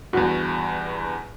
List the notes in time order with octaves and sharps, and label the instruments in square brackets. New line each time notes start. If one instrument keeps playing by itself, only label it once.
[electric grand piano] E2 G2 [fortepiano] F#4